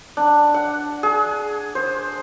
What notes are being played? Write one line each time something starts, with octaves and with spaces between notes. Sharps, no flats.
D4
F#5
G#4
C5